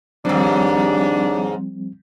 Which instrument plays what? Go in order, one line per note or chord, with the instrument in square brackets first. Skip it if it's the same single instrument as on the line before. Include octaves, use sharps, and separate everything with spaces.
[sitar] D#2 G#2 [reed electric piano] F3 G3 C4 [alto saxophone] D4